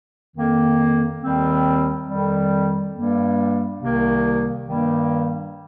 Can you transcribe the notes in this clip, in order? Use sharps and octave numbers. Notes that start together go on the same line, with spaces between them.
F2 D#3 A#3
D#2 D#3 G3 C4
F2 D#3 G3
G2 G3 A#3
C2 C3 D#3 A#3
G2 D#3 G3 A#3